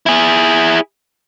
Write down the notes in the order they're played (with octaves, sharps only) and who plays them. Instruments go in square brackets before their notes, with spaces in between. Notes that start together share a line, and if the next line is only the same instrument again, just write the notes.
[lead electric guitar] E4 G#4